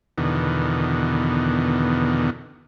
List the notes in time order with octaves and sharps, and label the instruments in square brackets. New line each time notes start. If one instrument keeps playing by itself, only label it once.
[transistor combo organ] E2 B2 D3 D#3